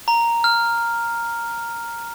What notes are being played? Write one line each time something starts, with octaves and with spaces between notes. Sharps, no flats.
A#5
F6